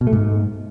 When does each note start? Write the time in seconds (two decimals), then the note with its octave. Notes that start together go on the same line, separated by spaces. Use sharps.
0.01 B2
0.07 A3
0.13 G#2